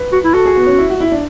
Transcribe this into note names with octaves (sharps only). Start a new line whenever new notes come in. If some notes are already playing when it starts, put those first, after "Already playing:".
Already playing: B4
F#4
E4
F#4 A4
G#4
B3
C#4
E4
F#4
E4
D4